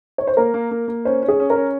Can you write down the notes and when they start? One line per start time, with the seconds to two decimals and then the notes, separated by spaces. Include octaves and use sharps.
0.18 C#5
0.27 C5
0.37 A#3 A#4
0.54 A#3
0.71 A#3
0.88 A#3
1.05 C#4 C5
1.22 C#4
1.28 G#4
1.40 C#4
1.50 A#4
1.56 C#4